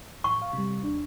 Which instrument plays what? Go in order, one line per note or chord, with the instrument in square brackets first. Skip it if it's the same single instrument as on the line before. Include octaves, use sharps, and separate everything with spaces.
[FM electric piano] A1 [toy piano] C#6
[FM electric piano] F5
C3 G3
D#2 D4